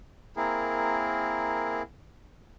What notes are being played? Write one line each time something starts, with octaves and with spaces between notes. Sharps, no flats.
A#3 C4 E4 G#4 A#4